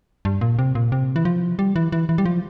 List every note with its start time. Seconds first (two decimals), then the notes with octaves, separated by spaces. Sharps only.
0.25 G2
0.41 A#2
0.59 C3
0.75 A#2
0.92 C3
1.16 E3
1.25 F3
1.59 G3
1.76 E3
1.92 E3
2.09 E3
2.18 G3
2.26 F3